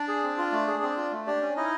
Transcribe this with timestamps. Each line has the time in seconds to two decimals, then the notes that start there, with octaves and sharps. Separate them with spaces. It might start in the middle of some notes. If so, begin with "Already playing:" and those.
Already playing: D4 D5
0.08 G#4
0.23 C4
0.38 F4
0.52 A3
0.67 G#4
0.83 C4
0.97 F4
1.12 A3
1.27 D4 G4 D5
1.41 C#4
1.57 D#4 E4 D#5